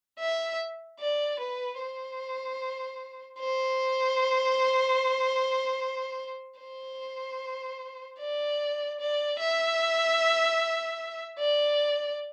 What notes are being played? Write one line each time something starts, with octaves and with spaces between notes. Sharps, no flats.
E5
D5
B4
C5
C5
C5
D5
D5
E5
D5